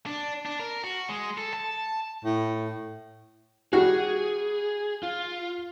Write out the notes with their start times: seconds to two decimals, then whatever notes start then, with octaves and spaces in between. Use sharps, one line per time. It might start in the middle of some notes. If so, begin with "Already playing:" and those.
0.06 D4
0.45 D4
0.60 A#4
0.84 F#4
1.09 G#3
1.38 A4
1.54 A5
2.25 A2
3.73 G3 F#4 G#4
5.03 F4